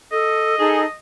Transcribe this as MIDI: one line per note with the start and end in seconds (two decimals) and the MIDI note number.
0.12 0.56 69
0.12 0.96 75
0.60 0.85 63
0.60 0.84 68
0.60 0.84 69